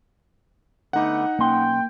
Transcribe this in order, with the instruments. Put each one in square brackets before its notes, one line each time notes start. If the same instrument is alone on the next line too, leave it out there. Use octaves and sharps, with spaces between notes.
[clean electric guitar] D3 A3 B3 [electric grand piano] D#4 F#5
[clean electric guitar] B1 C#4 C6 [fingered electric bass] A#3 [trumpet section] G5